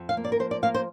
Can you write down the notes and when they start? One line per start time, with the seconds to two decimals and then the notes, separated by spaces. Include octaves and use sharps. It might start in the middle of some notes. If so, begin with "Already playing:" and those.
Already playing: F2
0.09 F5
0.17 A#3
0.24 D5
0.32 A#4
0.39 F3 C5
0.51 D5
0.63 A#3 F5
0.74 C5